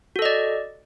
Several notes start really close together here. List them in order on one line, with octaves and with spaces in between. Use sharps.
F#4 A4 D#5 D5